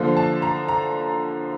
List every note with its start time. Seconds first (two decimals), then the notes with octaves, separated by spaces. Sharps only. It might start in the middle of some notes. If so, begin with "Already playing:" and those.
Already playing: D3 F3 A#3
0.17 A5
0.42 A#5
0.68 A#5